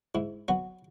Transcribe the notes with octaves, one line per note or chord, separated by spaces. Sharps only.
G#2 E4
F#3 B3 F#4